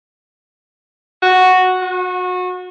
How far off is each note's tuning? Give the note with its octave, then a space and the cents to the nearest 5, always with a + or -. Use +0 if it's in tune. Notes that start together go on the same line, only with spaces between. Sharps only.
F#4 -5
F#4 -30